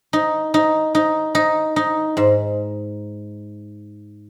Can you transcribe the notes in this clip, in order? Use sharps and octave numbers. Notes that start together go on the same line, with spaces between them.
D#4
D#4
D#4
D#4
D#4
G#2